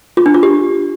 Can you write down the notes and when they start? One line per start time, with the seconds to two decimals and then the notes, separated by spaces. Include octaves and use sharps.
0.17 F4
0.26 D4
0.34 F4
0.43 G4